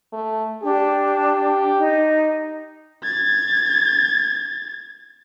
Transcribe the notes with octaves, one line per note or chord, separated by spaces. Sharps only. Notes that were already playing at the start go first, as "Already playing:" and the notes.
A3
D4 G4
D#4
G#6 A6